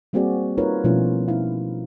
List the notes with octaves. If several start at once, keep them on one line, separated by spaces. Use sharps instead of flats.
G3 A#3 C4 F#4 G#4 D5
D#4 F4 A#4 B4 C#5
B2 F3 A3 C#4 E4 F4
D#4 E4 F5